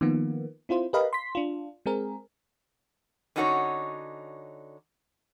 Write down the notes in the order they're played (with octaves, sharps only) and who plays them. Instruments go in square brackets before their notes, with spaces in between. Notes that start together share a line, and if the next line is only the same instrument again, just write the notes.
[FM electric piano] D#3 F3 A#3 B3
C4 E4 F4 C5
G4 A#4 B4 D#5 F5 B5
C6 B6
D4 F4
G#3 C4 G#4 A#4
[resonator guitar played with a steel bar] D3 C#4 D#4 F#4 B4 C#5